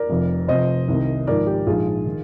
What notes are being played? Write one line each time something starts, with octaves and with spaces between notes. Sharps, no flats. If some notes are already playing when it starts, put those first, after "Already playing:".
Already playing: A#4 D5
F1 F2 C3
F1 F2 C3 F3 C5 D#5
C2 C3 D#3
G#1 G#2 F3 A#4 D5
G4 A#4
A#1 G#2 F3 F4 G#4
D#3